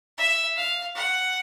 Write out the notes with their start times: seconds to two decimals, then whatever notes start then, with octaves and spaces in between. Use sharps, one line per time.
0.18 E5
0.56 F5
0.95 F#5